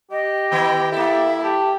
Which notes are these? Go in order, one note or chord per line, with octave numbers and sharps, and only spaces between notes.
G4 D#5
D#3 B3 E4 G5
A#3 E4 A4 E5
G4 A5